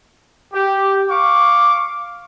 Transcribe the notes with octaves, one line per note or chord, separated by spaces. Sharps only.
G4
F5 C#6 D6